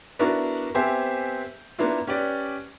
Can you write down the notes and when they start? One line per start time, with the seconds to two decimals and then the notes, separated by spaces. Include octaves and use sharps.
0.19 B3 D4 E4 F#4 A#4
0.75 B3 C4 G4 C5 E5 G#5
1.79 A#3 B3 D4 E4 F4
2.07 C#4 G4 B4 D5